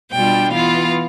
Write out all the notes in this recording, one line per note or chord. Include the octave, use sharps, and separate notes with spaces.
B2 G3 D4 F4 G5
E3 B3 F4 F5